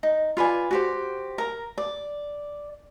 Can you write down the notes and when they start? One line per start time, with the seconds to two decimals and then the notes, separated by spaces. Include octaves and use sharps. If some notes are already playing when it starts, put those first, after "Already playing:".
0.03 D#4
0.37 F4 B4 D5 G#5
0.71 F#4 G4 C5
1.38 A#4 A#5
1.78 D5